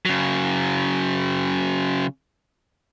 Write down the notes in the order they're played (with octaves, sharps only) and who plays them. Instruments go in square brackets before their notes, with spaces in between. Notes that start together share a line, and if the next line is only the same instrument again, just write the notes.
[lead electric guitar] C#3 F#3